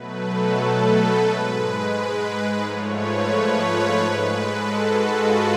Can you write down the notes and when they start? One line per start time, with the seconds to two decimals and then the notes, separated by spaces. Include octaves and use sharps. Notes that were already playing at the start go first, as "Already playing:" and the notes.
Already playing: B2 F#3 A3 B4
0.21 A4
0.56 B4
1.25 G#2 G#3
2.63 G#2 F3 A3 C#5
2.97 B4
3.33 C#5
3.67 C#5
4.01 G#2 G#3 B4
4.36 A4
4.71 F#4
5.05 F4